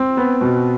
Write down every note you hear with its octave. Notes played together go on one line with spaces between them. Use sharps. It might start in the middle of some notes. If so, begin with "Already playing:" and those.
Already playing: C4
B3
B2